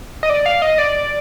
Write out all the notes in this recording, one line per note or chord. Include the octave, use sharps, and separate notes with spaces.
D#5
D5
F5
D#5
D5